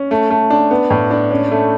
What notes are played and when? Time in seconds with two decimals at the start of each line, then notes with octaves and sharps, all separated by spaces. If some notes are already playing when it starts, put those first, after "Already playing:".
Already playing: C#4
0.11 A3
0.30 A3
0.50 D4
0.71 B3
0.90 A2
1.11 D4
1.31 C#4
1.51 A3